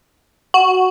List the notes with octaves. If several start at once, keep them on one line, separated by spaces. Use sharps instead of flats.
F#4